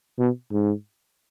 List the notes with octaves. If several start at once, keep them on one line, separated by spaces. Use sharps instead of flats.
B2
G#2